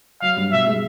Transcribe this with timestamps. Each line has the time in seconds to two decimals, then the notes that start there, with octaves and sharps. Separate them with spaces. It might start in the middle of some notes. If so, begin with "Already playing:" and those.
0.21 F#3 F5
0.37 G2
0.52 B2 E5
0.67 G#3